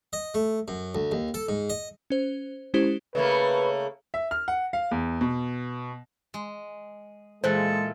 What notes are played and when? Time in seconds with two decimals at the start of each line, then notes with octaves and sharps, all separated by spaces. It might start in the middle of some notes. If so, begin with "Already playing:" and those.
0.13 D#5
0.34 A3
0.68 F#2
0.95 D2
1.12 D#2
1.34 A4
1.49 G#2
1.70 D#5
2.10 C#4 C5
2.74 G#3 C#4 E4 G4 C5
3.15 C#3 A3 A#3 B4
4.14 E5
4.31 F6
4.48 F#5
4.73 F5
4.91 E2
5.21 B2
6.34 G#3
7.44 A#2 E3 G#3 A4 C5 F#6